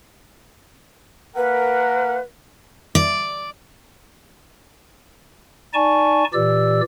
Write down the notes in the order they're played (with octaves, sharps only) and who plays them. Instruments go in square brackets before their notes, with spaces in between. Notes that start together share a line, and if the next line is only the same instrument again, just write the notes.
[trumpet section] A#3 A#4 F#5 [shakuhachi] B4
[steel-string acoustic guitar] D5
[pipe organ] D#4 D5 G#5 A5 C#6
A#2 E3 G4 D5 E6